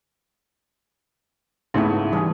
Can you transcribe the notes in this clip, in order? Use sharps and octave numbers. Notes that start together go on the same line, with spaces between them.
G#2 C#3 A3 B3 E4
E3 G3 G#4